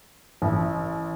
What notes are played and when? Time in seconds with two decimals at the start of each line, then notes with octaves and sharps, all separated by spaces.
0.42 A1